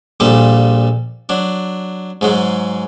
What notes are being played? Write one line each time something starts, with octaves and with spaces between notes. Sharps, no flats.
A#1 A#2 G3 A4 A5
F#3 D4
G#2 F#3 G#3